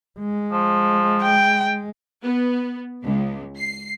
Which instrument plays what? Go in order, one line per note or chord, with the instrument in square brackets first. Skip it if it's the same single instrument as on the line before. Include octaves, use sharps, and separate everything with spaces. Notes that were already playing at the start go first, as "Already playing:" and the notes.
[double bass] G#3
[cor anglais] F3
[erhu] G5
[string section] B3
C#2
C7